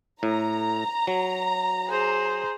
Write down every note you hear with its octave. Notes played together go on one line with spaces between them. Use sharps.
A2 A#5
F#3
G#4 C5